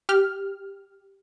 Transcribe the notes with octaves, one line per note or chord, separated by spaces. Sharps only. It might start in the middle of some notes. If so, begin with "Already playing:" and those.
G4 F6